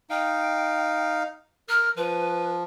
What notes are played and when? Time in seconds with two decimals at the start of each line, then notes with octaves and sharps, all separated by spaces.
0.10 D#4 F5 G5
1.69 A#4 F6
1.97 F3 B4